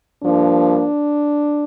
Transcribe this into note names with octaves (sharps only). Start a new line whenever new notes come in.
G2 F3 A#3 D4